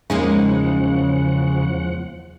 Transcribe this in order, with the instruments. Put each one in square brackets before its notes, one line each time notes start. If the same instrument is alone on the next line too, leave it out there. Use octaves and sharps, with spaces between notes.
[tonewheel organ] E2 F3 F#5 [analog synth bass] C#3 [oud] G#3 A#3 D#4